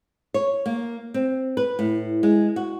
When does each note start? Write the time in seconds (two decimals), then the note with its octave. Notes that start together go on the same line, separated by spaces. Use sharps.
0.34 C#5
0.66 A#3
1.14 C4
1.57 B4
1.79 A2
2.23 G#3
2.56 F#4